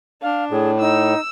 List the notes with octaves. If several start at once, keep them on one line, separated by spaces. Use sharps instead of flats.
D4 F5
A2 G#4
D#4 E6